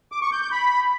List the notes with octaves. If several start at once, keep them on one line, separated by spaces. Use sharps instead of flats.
D6
C#6
G6
G6
B5